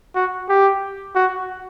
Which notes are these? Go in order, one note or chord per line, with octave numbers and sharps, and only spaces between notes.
F#4
G4
F#4